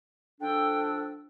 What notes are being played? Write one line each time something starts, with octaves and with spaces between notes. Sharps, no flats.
F3 D4 A4 G5